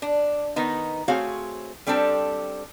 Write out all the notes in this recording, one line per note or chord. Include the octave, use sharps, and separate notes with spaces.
D4
D#3 B3 D#4
A3 C4 F#4 G#4 C#5 F5
G3 C4 D4 G4 A4